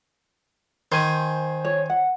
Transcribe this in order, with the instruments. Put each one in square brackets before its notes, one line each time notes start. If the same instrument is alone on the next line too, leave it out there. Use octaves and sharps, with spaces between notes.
[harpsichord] D#3 [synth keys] C5 G#5
[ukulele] C#5
F#5